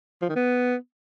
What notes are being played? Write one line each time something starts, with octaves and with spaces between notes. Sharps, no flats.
F3
D#3
B3